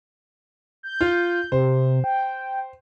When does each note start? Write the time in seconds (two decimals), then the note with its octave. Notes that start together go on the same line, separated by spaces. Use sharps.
0.83 G6
1.01 F4
1.52 C3 C5
2.04 G5